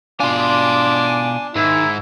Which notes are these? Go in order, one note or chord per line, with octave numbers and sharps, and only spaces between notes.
B2 D4 F4 G#5 C6 D6
G#2 D#3 E4